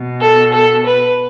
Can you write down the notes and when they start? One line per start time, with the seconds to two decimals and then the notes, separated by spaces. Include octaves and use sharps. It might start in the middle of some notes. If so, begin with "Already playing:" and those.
Already playing: B2
0.21 A4
0.53 A4
0.87 B4